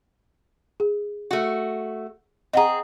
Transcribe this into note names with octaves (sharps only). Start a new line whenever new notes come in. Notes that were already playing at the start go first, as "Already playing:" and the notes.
G#4
A3 F#4
C4 G#4 D#5 F#5 A#5